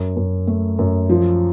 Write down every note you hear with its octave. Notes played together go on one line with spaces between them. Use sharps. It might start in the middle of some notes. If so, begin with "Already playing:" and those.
Already playing: F#2
F#2
A3
F#2
F3